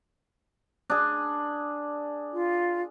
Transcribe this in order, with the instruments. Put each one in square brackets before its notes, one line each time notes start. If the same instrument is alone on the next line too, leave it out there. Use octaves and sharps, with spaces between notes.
[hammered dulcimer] D4 G#4
[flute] F4